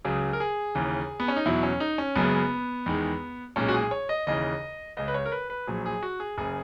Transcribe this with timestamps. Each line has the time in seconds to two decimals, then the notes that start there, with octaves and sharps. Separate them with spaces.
0.05 C#2 C#3 F#3 G#4
0.33 A#4
0.40 G#4
0.75 D#2 C#3 E3
1.20 B3
1.28 C#4
1.36 D#4
1.46 E2 B2 F#3 E4
1.63 C#4
1.80 D#4
1.98 C#4
2.15 F#1 F#2 C#3 G#3 B3
2.86 E2 D#3 G#3
3.56 B1 A#2 G#3 C#4
3.69 F#4
3.74 G#4
3.91 C#5
4.09 D#5
4.27 D#2 C#3 E3 D#5
4.97 C#2 C#3 G#3 D#5
5.08 B4
5.14 C#5
5.26 A#4
5.32 B4
5.50 B4
5.67 A#1 A#2 F#3 G#4
5.86 G#4
6.03 F#4
6.20 G#4
6.38 F#1 C#3 G#4